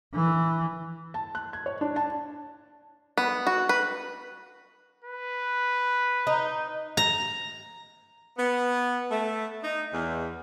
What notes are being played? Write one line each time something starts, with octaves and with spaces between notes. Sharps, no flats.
E3
A5
F#6
G#6
C#5
D4
A5
B3
F#4
B4
B4
D#4
A#5
B3
A3
D#4
E2